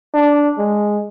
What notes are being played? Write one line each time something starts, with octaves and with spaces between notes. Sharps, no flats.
D4
G#3